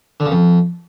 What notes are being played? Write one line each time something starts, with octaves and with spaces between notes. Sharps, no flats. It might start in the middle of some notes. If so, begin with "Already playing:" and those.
D3
C#3
F2